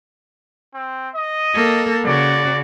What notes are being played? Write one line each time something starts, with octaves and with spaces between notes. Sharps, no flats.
C4
D#5
A#3 A4
C#3 F#4 D5